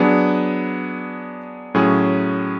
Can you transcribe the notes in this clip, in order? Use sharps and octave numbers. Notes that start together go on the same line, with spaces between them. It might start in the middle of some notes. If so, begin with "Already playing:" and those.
Already playing: F#3 B3 D4 G#4
A2 F#3 C#4 G#4